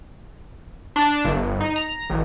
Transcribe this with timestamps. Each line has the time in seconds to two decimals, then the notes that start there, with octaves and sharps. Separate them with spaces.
0.96 D4
1.25 G1
1.61 D#4
1.76 A#5
2.10 A1